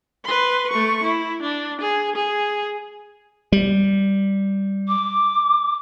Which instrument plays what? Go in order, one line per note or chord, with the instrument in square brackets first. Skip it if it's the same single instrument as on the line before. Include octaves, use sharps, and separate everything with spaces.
[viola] B4 C6
A3 C#6
E4
D4
G#4
G#4
[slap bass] G3
[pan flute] D6